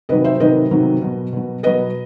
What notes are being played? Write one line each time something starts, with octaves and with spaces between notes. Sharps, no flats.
C3 D#3 F#3 B4 D#5
C5 E5
C3 D#3 F#3 B4 D#5
C3 D#3 F#3
B2 F#3
B2 F#3
B2 F#3 B4 D#5